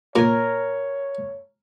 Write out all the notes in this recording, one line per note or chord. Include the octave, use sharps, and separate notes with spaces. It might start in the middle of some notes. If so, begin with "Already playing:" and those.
A#2 A#4 C#5 G#5